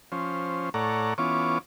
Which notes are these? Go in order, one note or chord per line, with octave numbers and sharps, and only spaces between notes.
F3 C#4 C5
A2 A4 C#5 D5 F#5 A#5
E3 B3 C#4 F4 C#5 D6